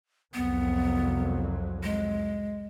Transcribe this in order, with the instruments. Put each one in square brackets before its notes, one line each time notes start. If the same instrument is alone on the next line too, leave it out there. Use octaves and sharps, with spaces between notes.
[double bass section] C2 F2 F#3 [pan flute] B3
[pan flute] G#3